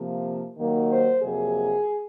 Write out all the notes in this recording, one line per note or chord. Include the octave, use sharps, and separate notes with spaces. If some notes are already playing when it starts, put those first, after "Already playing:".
Already playing: C3 F3 A#3
D#2 D#3 F#3 A#3
C5
F2 C3 F#3 A#3 G#4